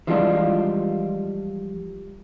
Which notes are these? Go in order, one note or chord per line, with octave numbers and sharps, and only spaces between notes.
E3 F3 G3 G#3 D4 F4